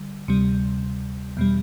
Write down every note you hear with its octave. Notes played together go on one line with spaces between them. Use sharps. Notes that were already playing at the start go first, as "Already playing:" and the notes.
Already playing: D3 G3
D2 C3 G3
E2 B2 G3